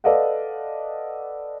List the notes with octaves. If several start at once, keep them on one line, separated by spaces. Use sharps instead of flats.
A4 B4 D5 D#5 F5 F#5